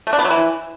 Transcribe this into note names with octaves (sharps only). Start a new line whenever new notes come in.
A3
D4
B3
F#3
E3